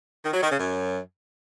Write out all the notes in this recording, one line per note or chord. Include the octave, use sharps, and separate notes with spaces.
D#3
F#3
D#3
C#3
F#2